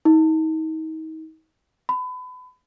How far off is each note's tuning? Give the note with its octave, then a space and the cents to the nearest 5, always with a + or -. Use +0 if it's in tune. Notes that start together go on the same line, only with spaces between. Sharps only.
D#4 +35
B5 +30